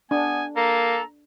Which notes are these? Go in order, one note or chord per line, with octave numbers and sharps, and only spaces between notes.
B3 D4 G#5
A#3 A4 A#5